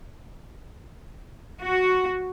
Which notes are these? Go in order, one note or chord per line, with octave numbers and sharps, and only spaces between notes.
F#4